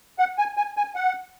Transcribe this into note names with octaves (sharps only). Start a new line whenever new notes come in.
F#5
G#5
G#5
G#5
F#5